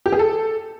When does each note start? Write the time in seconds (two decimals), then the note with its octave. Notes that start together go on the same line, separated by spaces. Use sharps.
0.06 G4
0.12 G#4
0.19 A4